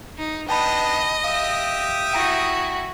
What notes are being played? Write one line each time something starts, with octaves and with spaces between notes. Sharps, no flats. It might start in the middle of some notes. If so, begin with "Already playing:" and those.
D#4
B3 D4 D#4 D#5 G5 A5 B5
G4 E5 F5 D#6
E4 F#4 G5 A#5 A#6